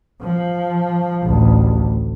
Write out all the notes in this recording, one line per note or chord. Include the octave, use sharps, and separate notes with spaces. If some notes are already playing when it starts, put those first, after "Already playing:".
F3
A1 D2